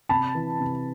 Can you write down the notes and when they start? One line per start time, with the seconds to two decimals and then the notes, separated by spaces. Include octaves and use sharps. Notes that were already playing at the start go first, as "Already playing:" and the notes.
0.09 C3 A5 B5
0.35 E3
0.60 C3